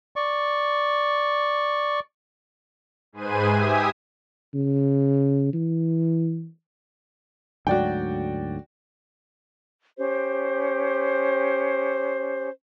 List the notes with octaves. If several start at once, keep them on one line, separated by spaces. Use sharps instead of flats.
D5 C#6
G#2 G#4 B4 C5 G#5 D#7
G4 E5 G#5 D#6
C#3
E3
D2 G#2 F#3 F#4 D5 G5
C#4 G4 C5